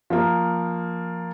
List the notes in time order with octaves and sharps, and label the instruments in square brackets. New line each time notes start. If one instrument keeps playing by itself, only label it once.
[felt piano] F3 A#3